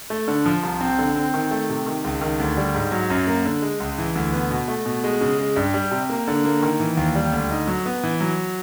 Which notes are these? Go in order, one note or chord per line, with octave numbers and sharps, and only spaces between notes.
A3
D3
F3
C2
C4
D3
C4
D#3
A3
C3
D#3
C#2
D#3
D2
G3
G#2
F#3
F#2
A#3
D3
G#3
C#2
E3
D2
B3
B2
A3
B2
G#3
C#3
G#3
G2
G3
C3
A#3
D3
A#3
D#3
E3
D#2
G3
D2
D#4
F#3
B3
E3
F#3